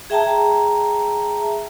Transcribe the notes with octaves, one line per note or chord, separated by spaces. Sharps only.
G#4 E5 G5 A5 A#5